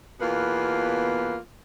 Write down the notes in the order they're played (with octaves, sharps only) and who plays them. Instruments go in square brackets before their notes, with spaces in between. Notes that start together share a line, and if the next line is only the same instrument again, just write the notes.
[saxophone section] E2 B2 A#3 F4 B4